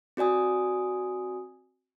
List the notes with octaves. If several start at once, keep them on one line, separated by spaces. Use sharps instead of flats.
C4 F#4 D5 G#5 D#6